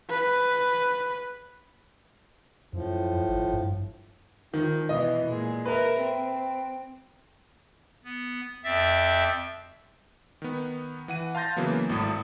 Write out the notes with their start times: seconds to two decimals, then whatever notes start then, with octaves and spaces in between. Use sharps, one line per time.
0.10 B4
2.73 F#2 A2 F3
3.28 G#1
3.53 G2
4.54 D#3 F3
4.89 B2 E3 D#5
5.27 A#2 G#3
5.65 A#4 B4 E5
5.99 C4
8.04 B3
8.64 F2 C4 E5 A6
10.42 D#3 B3
11.08 E3 F#5 D#7
11.35 F5 A5 C6 G6 A6 A#6
11.57 C#3 E3 F#3 A#3 B3
11.89 G#1 A2 D#6